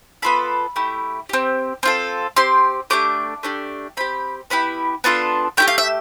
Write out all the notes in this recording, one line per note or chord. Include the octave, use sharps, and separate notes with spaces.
B3 F4 A4 B5
A3 E4 G4
C4 G4
C4 F4 A4
C4 G4 C6
A3 D4 G4 D6
A3 D4 G4
C4 G4 B5
B3 E4 G4 B5
B3 D4 F4 A4 A5
A3 E4 G4 G5
F5
E5